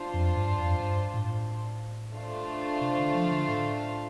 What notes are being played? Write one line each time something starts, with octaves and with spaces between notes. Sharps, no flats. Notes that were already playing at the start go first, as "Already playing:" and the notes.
Already playing: D4 F4 C5
F2
G2
F2
G2
A2
A3 D4 F4 C5 F5
C3
D3
F3
D3
A2